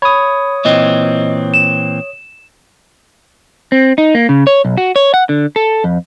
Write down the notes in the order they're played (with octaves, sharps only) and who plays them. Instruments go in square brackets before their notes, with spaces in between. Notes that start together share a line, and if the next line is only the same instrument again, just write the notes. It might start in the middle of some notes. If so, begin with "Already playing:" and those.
[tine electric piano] C#5 D#6 [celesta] B5
[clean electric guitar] A#2 E3 C4 [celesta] D#5
[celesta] E7
[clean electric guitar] C4
D#4
A#3
C#3
C#5
B1
F#4
C#5
F#5
D3
A4
F2